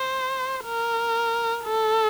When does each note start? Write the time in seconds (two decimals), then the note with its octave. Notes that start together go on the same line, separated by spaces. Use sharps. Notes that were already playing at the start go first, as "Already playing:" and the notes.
Already playing: C5
0.65 A#4
1.65 A4